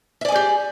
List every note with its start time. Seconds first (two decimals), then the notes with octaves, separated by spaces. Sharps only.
0.21 E5
0.25 D5
0.28 G#5
0.32 G#4
0.36 G4